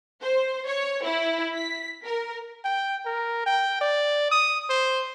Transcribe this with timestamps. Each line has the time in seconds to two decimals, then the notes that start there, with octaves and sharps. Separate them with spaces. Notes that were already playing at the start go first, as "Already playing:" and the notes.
0.21 C5
0.67 C#5
1.02 E4
1.54 B6
2.04 A#4
2.65 G5
3.06 A#4
3.46 G5
3.81 D5
4.31 D#6
4.70 C5